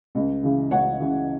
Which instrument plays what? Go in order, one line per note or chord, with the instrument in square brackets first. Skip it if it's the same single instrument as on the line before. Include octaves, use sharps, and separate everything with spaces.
[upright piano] C#2
C#3 E3
C#2 C#5 F#5
C#3 E3